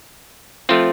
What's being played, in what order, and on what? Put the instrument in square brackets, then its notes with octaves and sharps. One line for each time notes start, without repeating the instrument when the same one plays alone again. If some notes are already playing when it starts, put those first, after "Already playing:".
[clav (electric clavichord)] F3 A3 C4 F4